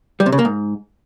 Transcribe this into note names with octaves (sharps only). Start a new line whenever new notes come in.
G3
C3
C#3
A#3
G#2